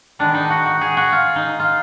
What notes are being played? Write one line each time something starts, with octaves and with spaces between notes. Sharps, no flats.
D#3 G#3 B3 D4
D#4
F#4
F#4
G#4
F#4
F4
D#4
F4